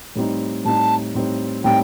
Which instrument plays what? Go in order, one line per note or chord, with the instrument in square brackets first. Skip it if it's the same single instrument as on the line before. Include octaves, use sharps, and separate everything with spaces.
[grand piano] A2 G3 C4 D#4
[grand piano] A2 G3 C4 D#4 [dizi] A5
[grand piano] A2 G3 C4 D#4
[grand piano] A2 G3 C4 D#4 [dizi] G5